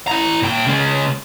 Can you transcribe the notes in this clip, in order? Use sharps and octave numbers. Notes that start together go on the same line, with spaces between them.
E4 A#5
A#2 G5
C#3 G#3